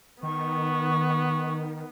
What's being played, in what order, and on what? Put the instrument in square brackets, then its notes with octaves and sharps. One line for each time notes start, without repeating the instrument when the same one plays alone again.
[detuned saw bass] D#3 [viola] B3 [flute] C#6